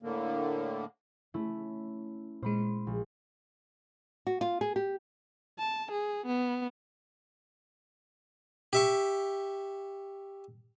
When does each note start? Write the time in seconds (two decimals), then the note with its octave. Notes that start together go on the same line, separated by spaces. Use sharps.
0.02 A2 D3 A#3
1.34 A3 C#4 E4
2.43 A#2 G#3 C5 B5 C6
2.87 A#1
4.27 F#4
4.41 F4
4.61 G#4
4.76 G4
5.59 A5
5.92 G#4
6.27 B3
8.73 G4 E5 C#6